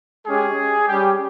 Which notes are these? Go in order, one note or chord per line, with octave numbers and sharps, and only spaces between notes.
G#3 C#4 G4 G#4
G3 C#4 G4